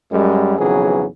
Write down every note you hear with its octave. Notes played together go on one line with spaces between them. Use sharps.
F#2 G3 G#3
B1 F2 C#3 E3 F#3 G#4